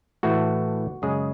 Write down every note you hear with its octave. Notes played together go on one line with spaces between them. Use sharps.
A2 E3 A3 F#4
F#2 C#3 G#3 G#4